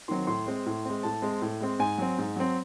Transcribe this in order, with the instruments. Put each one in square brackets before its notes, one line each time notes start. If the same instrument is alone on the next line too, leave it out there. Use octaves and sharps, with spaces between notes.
[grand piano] D#3 F#3 C4 C6
A2 C6
G#3 C4
A2
G#3 C4
A2 A5
G#3 C4
A2
G#3 C4
G#2 G#5
F#3 C4
G#2
F#3 C4